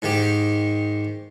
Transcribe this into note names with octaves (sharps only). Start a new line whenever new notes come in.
G#2 D#3 G4